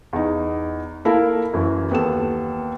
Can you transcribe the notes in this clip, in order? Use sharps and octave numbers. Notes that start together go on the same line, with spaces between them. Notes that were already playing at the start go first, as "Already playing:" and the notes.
E2 D#4
A#3 E4 A4 A#4 F5
F#2 E3
D#2 B3 A4 E7